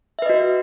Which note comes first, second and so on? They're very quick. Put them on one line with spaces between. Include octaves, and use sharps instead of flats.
E5 B4 D#5 F#4